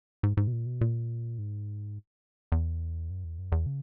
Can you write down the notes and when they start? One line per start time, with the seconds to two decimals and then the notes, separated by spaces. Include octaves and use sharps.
0.23 G#2
0.37 G#2
0.47 B2
0.52 A#2
0.66 B2
0.81 A#2
1.38 G#2
2.52 E2
3.10 F#2
3.24 E2
3.39 F#2
3.52 E2
3.66 C#3